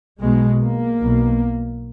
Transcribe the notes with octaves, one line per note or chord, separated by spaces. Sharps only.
B1 B2 G#3
A#3
B1 B2